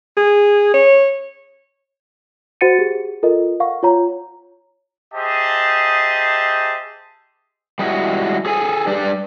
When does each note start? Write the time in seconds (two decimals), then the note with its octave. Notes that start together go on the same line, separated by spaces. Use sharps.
0.17 G#4
0.74 C#5
2.61 F#4 C5 F#5 A6 C#7 D#7
2.79 G4 G#4
3.23 F4 A4 A#4 D#5
3.60 F5 F#5 C#6
3.83 F4 C#5 A#5
5.14 G4 G#4 C5 D#5 E5 A5
7.79 G3 G#3 E4 F#4
8.46 G#4 A4 G#5
8.87 G3 D4 G4 B4 D5